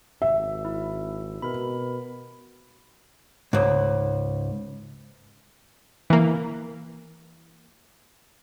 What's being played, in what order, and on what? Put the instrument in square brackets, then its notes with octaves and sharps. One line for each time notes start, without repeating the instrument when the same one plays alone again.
[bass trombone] G#1 [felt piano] E5
[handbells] E4
[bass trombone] B2 [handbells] A#4 B5
[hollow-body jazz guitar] C#2 G#2
[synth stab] E3 A#3